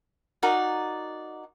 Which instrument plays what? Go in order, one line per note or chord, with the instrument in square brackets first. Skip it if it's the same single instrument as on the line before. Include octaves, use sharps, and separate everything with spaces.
[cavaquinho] D#4 F#4 A#4 D5